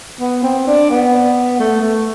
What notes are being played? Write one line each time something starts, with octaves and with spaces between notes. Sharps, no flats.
B3
C4
D4
B3
A3
A3